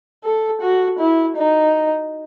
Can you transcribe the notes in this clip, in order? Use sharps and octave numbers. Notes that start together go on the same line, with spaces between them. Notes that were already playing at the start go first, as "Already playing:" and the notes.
A4
F#4
E4
D#4